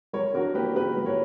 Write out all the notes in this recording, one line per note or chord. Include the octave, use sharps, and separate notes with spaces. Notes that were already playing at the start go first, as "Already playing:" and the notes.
G3 A#4 C#5
D4 F#4 A#4
A#3 G4 B4
C#3 G4 B4
G3
A#4 C#5